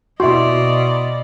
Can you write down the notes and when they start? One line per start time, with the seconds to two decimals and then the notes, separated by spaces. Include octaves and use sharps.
0.20 B2 E4 F#4 D5 D#5 C6